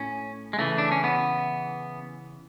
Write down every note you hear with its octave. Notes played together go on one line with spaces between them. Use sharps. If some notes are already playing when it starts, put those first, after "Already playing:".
Already playing: A2 C#4
G#3
C#3 E3 A3
D4
C#4
B3